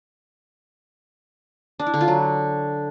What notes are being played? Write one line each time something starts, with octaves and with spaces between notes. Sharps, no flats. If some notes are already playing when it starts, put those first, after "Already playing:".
D4
E4
D3
F4
F#3